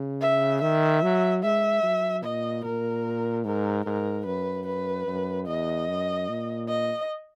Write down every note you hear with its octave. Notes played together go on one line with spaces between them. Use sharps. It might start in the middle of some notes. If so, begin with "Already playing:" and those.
Already playing: C#3
E5
D#3 E5
F#3
G#3 E5
F#3
A#2 D#5
A#2 A#4
G#2 A#4
G#2 A#4
F#2 B4
B4
F#2
E2 D#5
F#2
A#2
D#5